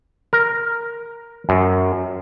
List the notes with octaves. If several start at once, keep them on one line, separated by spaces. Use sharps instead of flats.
A#4
F#2